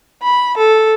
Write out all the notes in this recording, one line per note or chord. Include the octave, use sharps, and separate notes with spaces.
B5
A4